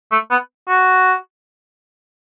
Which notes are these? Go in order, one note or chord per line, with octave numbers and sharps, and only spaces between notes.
A3
B3
F#4